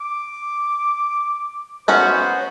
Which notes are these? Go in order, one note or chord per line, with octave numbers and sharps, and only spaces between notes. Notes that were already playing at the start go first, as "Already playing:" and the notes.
D6
B3 C#4 F#4 C5